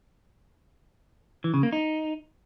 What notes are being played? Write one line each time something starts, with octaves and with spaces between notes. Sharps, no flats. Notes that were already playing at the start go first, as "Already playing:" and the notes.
E3
C#3
A#3
D#4